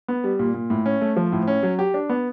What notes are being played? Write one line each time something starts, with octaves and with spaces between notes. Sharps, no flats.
B3
G3
A#2
A#2
A2
C#4
A3
F3
A2
C#4
F#3
G4
D4
B3